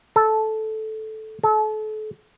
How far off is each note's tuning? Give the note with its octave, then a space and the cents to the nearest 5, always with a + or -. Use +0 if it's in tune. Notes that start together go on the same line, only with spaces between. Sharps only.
A4 -10
A4 -35